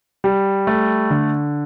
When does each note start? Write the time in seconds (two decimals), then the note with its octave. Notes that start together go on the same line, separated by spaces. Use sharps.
0.24 G3
0.67 A3
1.10 D3